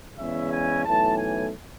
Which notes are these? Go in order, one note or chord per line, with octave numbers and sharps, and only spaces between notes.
E2 C#3 G#3 C#4 E4 E5
G#5
B1 A2 E3 A3 A5
G#5